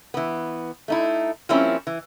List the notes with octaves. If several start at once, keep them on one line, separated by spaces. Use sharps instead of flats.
E3 B3
A3 D#4 E4
F3 G3 A#3 C4 C#4 E4
E3